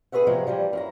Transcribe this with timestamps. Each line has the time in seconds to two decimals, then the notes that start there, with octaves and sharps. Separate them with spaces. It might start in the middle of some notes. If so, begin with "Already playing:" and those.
0.12 G#4 B4 C#5 E5 F#5
0.27 C3 F3 F#3 G#3
0.47 E3 F3 G3
0.73 F#2 E4 A#5